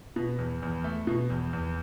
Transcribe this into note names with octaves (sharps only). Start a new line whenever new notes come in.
B2
E2
E2
A3
B2
E2
E2